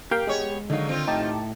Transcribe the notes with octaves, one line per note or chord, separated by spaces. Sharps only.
A#3 G4 F5 G5
G#3 B3 C#5
D3 D#3 F#3 D#4 F5
D#3 C4 F4
A2 D#4 G4 A5